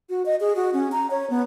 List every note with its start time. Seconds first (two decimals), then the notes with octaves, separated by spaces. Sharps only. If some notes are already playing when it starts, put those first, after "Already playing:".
0.10 F#4
0.26 D#5
0.40 G#4
0.56 F#4
0.73 C#4
0.92 A#5
1.11 C#5
1.30 B3